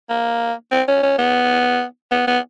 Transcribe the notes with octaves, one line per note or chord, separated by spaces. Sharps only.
A#3
C4
C#4
C#4
B3
B3
B3